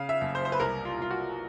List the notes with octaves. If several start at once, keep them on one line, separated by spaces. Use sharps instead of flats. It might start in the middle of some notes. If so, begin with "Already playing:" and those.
Already playing: C#3 F5
E5
F#1
C5
C5
B4
C2 A#4
F4
C2 F4
F#4